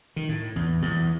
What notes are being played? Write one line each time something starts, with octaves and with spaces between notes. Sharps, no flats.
D#3
A2
E2
E2